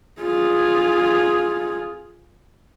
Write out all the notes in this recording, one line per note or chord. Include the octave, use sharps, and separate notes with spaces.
F4 G#4